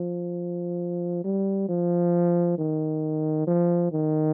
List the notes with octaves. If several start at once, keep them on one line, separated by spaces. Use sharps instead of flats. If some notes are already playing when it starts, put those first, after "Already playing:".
Already playing: F3
G3
F3
D#3
F3
D#3